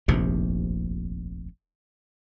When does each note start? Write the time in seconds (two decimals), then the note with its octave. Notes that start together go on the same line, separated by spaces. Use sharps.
0.08 F1 A#1 D#2 C3